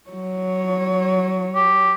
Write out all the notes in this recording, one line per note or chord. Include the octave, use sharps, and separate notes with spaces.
F#3 C#5
G4